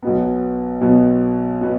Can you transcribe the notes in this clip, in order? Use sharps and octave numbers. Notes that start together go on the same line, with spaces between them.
B1 B2 B3
B1 B2 B3
B2 B3